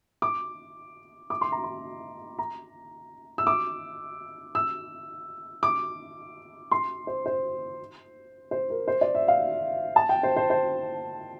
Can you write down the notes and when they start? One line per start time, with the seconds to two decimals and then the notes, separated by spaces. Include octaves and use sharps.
0.22 D6
1.30 D6
1.41 C6
1.52 A#5
1.64 C6
2.39 A#5
3.38 E6
3.47 D6
4.55 E6
5.63 D6
6.71 C6
7.07 C5
7.26 C5
8.51 C5
8.70 A#4
8.88 C5
9.01 D5
9.15 E5
9.28 F5
9.96 A5
10.09 G5
10.23 C5
10.36 C5
10.50 C5